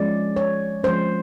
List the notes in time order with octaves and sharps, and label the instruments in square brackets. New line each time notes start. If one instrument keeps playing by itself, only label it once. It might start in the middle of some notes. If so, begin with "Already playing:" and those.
Already playing: [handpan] F3 G#3 C#4 D5
C#5
F3 G#3 C#4 C5